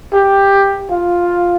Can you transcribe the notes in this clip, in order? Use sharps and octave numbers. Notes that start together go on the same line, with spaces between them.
G4
F4